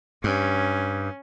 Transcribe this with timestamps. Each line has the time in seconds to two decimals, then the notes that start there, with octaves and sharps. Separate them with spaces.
0.24 G2 C#4